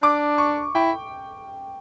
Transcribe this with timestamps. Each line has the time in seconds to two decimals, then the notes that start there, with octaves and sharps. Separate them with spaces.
0.02 D4 D6
0.38 C#6
0.75 E4 G5